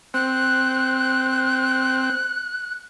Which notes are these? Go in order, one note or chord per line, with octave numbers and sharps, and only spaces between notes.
C4 F#6